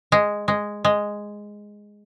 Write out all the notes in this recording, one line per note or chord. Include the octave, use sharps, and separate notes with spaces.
G#3
G#3
G#3